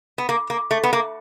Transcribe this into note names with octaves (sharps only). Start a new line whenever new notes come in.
B3
A#3
A#3
A3
B3
A#3